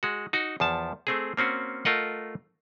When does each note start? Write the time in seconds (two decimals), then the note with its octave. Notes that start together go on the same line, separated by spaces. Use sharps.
0.03 G#3 F#4
0.33 D#4 F#4
0.60 E2 F3 A5
1.07 A3 C4 G#4
1.37 A#3 C4 C#4 F#4
1.85 A3 F4 A#4 D#5 F#5